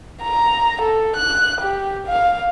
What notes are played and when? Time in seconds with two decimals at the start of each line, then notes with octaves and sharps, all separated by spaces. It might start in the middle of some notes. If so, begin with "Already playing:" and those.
0.23 A#5
0.82 A4
1.16 F#6
1.61 G4
2.07 F5